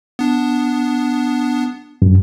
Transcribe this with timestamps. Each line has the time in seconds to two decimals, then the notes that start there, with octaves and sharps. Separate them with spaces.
0.19 B3 D4
2.02 F#2